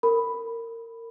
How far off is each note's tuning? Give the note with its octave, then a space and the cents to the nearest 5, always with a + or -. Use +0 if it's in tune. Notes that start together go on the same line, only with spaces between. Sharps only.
A#4 -25 B5 +0